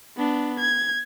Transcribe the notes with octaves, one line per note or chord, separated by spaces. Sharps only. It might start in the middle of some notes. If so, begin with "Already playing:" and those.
B3 D4
G#6